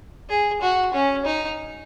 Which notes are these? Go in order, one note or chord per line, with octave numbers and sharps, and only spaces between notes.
G#4
F#4
C#4
D#4